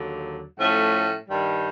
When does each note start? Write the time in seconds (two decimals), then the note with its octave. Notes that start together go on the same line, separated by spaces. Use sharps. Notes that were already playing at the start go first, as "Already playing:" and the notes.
Already playing: D#2 D3 F#3
0.58 A2 F3 A3 C#4
1.29 G2 D#3 G3